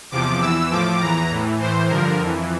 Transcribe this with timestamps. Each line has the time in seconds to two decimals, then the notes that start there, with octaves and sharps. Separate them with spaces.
0.11 E2 C3 F3 D6
0.41 E2 E3 E6
0.70 A2 F3 D6
1.00 E2 E3 A#5
1.30 A2 E3
1.60 A2 E3 C5
1.89 G2 D3 F3 A#4
2.20 F2 E3